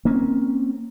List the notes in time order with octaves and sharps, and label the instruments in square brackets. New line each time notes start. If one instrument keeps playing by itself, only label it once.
[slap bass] A#3 C4 C#4